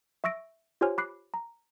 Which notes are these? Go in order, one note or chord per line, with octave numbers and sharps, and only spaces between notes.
E5 C#6 E6 A#6 D7
F4 G4 C5 C#5 G#5 F6
B5 D6 F#6 C7
A#5